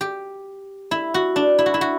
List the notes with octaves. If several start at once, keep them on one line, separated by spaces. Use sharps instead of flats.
G4
E4
F#4
D4
E4
F#4
E4
F#4